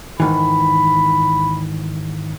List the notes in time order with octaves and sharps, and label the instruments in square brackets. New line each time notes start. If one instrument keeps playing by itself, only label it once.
[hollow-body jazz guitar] G#2 D#3 E3 [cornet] B5